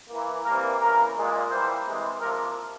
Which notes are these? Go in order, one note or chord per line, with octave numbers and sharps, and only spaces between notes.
E3 A#3
C3 E3 G3 A#3 A#4
C#3 E3 A#3 A#4
A#2 G#3
E3 G3 A#3 C5
C3 E3 G#3
C3 F3 A#3 A#4